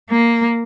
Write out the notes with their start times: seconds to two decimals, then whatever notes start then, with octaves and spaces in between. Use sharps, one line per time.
0.10 A#3